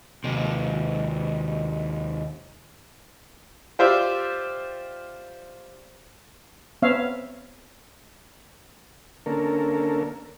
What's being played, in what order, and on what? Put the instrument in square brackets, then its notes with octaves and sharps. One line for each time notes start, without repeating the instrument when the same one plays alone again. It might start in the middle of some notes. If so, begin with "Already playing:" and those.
[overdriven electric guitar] D#2 C3
[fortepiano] F4 G4 C5 D5 E5 F5
[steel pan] B3 C4 C5 C#5 E5 F5
[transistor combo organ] D3 A#3 C#4 A4 A#4